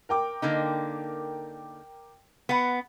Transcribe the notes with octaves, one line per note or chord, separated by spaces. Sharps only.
A#4 G5 D6
D3 A#3 D#4
B3 F#5